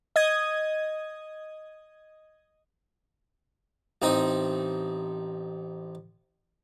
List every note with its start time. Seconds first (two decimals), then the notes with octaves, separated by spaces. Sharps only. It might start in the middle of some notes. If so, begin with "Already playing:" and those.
0.16 D#5 D#6 G#6
4.02 A1 C4 D#4 D#6